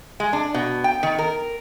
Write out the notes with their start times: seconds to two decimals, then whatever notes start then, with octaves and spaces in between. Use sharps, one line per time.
0.20 G#3
0.33 D4
0.54 B2
0.84 G5
1.03 D#3
1.18 A#4